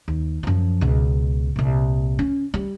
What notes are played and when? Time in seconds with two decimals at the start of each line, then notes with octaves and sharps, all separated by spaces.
0.08 D#2
0.43 F#2 F3
0.81 C#2 B2
1.56 C2 A#2
2.19 C#4
2.54 G3